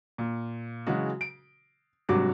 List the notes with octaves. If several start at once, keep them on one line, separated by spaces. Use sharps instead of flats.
A#2
C#3 E3 F#3 G#3 F#4
D7
G#1 G2 C3 F#3 F#4 D6